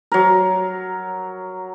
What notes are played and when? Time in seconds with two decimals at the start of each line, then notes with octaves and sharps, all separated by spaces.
0.12 F#3 A#4